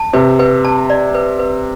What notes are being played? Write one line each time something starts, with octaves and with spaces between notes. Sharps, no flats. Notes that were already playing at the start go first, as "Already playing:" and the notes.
Already playing: A5
C3 B4
B4
A5
D5
B4
B4